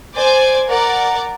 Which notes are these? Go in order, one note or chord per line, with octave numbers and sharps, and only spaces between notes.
C5 D5 G#5
A#4 D5 F#5